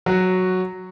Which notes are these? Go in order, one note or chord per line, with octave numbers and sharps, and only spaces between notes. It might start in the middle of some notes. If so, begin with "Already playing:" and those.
F#3 F#4